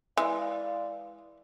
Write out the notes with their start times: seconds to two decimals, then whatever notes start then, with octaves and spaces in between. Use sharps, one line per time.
0.17 E3 G#3 B4 D5 F5